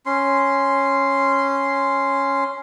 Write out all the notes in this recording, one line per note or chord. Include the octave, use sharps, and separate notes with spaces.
C#4 C6